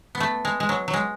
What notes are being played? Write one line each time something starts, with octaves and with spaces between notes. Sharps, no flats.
B3
A3
G#3
G#3
F#3
F#3
G#3